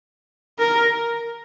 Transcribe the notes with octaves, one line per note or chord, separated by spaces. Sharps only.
A#4